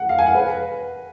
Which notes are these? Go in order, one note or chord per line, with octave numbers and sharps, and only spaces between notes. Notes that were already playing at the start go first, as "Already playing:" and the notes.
Already playing: F#5
F5
G#5
F#5
B4